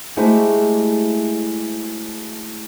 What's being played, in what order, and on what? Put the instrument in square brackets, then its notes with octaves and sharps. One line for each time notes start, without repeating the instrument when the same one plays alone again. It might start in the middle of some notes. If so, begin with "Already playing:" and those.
[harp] G#3 A3 E4 F#4 G4 C5